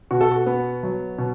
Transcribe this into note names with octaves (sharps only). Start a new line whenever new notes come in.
B2 F#4
A4
F#4
B3
F#3
B2